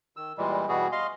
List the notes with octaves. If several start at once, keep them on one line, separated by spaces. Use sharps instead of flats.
D#3 E6
A#2 E3 G3 G#3
B2 E3 G3 F#4 G#4
D#5 F5 C6